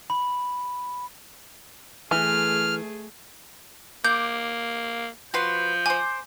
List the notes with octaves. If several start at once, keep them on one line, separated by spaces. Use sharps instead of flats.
B5
E3 A3 G#4 F6
A#3 D6 G6
F3 F#4 B4 C6 G6
C5 G#5 D6